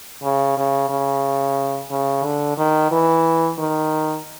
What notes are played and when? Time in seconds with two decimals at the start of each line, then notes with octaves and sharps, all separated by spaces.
0.23 C#3
0.57 C#3
0.90 C#3
1.91 C#3
2.24 D3
2.57 D#3
2.91 E3
3.59 D#3